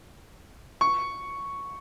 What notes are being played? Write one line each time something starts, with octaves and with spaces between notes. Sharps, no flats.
C#6